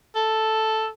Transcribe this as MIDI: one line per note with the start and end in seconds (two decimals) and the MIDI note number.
0.16 0.88 69